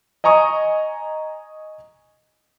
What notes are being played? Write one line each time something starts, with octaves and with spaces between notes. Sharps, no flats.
D#5 G#5 A#5 C#6 D#6